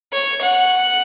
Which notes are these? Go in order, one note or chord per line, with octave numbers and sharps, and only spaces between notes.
C#5
F#5